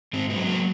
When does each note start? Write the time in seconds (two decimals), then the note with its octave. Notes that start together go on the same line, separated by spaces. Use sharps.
0.13 G#2 C4
0.30 B3
0.36 F#3
0.47 A#3